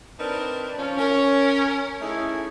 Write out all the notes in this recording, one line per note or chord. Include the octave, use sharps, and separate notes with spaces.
C4 D4 D#4 A#4 B4 D5
F3 C#4
C#4 A#4
A3 C#4 D#4 E4 G#4 A4